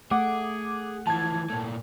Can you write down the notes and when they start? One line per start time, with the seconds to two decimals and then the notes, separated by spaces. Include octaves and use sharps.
0.11 A3 G#4 F#5 D6
1.07 E3 F3 A5 G#6
1.50 A#2 A3